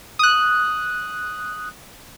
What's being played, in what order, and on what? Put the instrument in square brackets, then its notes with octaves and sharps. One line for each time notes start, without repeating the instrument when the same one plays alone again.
[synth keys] D#6 F#6